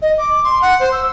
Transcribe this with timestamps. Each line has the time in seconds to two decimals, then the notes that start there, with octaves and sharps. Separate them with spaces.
0.01 D#5
0.17 D6
0.43 C6
0.61 F#5
0.79 C5
0.92 E6